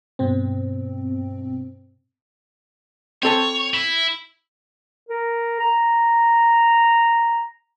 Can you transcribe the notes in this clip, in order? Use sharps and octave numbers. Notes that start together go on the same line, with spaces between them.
G2 B2 C4
C4 A4 C#5 A5
E4
A#4
A#5